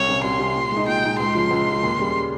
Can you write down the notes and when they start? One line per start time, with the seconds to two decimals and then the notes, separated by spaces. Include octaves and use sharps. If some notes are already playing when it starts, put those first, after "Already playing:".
Already playing: C2 C#5
0.09 C3 G3 C#4
0.24 C2 C6
0.39 C3 G3 C#4
0.56 A#2
0.72 G#3 D#4
0.87 A#2 G5
1.04 G#3 D#4
1.19 C#2 C6
1.35 C#3 F3
1.51 C#2
1.67 C#3 F3
1.83 D#2
1.99 C#3 G3